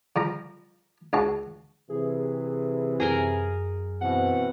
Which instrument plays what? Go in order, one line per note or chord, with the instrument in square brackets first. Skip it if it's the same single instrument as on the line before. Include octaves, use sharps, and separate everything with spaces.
[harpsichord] F3 G3 A#5
C#2 C#3 F#4 A5
[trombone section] C3 E3 [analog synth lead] G#4
[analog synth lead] F#2 [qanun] G#4 A#4 G#5
[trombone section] B2 E3 C4 [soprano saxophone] F#5